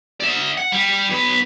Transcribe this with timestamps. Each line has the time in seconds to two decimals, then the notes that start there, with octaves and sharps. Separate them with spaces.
0.20 D5 E5
0.57 F#5
0.72 G3
1.10 B1 B4